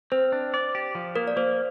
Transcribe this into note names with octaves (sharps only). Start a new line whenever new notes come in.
C4 C5
D4
D5
G4
F3
A#3 A#4
D5
A#3 C5